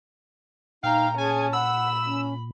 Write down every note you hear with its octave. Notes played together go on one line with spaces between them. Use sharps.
A#2 D#4 F5 G5 A#5
C#4 G#4 G#5 A5
F#5 B5 E6
C#4